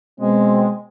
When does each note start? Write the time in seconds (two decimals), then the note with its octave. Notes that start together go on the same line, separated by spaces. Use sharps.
0.20 B2 G#3 C4